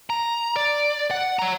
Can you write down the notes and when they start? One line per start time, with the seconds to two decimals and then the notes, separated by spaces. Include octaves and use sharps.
0.10 A#5
0.56 D5
1.11 F#5
1.39 C#5 A#5